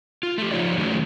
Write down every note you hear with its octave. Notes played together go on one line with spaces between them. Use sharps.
F4
A3 G4
F3 D#4 C#5 D5
D#3 F#3 A3 C#4 F#4 G#4